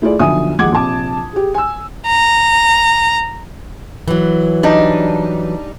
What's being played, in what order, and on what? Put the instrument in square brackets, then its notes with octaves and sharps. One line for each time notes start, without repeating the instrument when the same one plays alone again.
[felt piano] A3 E4 F4 G#4 D5
B1 D3 F3 E5 G#5 D#6
D#2 F3 G#3 F#5 D6 G#6
A#1 C3 A5 D6
G4 G#4
G#5 E6
[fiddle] A#5
[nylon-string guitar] E3 F#3
[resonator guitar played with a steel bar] G3 D4 D#4